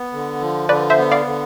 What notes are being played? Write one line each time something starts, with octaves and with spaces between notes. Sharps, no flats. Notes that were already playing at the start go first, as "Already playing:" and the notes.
Already playing: B3
D3
F3
D3 B4 D5
C5 E5
B3
D5 F5
D3